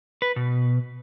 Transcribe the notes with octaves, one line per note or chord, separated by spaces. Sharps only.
B4
B2